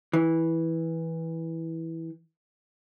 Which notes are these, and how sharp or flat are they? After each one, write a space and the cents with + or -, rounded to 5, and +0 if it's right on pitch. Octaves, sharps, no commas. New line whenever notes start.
E3 -10